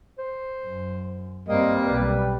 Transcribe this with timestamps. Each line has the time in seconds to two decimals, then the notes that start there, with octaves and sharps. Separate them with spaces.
0.19 C5
0.65 F#2
1.49 G2 G3 A#3 C4 D#5
1.87 B1 B2 B4